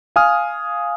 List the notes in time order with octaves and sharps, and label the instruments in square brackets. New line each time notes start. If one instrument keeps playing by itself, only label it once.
[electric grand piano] F5 G#5 D#6 F6